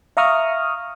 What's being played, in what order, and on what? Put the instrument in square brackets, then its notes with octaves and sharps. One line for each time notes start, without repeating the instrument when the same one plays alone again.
[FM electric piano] E5 F5 A#5 C#6 D#6 F6